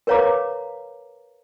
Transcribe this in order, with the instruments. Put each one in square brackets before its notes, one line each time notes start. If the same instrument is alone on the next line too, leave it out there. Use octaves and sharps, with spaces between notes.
[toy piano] A#4 B4 C#5 F5 A#5 D6